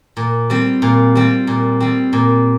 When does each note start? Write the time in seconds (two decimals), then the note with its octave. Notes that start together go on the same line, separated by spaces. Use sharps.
0.17 A#2
0.50 G3 C4
0.82 A#2
1.15 G3 C4
1.47 A#2
1.80 G3 C4
2.13 A#2